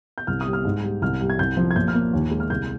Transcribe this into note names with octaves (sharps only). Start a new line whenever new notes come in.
G6
C2 F6
D#6
G3
F6
G#2
G3
C2 F6
G3
G#6
C2 G6
F3
G#6
A#2 G6
F6
A#3
D#2
G#3
F6
C2 G6